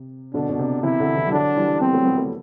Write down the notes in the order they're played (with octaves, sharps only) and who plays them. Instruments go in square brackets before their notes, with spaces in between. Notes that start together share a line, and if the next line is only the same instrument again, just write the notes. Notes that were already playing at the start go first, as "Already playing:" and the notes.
Already playing: [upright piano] C3
[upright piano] B2 D3 [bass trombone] D4
[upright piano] B2
C3
[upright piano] C3 E3 [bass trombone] E4
[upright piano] B2 D3
C3 E3
G3
[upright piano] D3 F#3 [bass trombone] D4
[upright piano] E3 G3
[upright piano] G3 B3 [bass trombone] C4
[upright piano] F#3 A3
G3 B3
F#3 A3